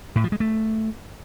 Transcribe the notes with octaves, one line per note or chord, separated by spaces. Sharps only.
A2
F3
G#3
A3